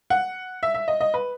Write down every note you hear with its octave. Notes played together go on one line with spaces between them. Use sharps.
F#5
E5
E5
D#5
D#5
B4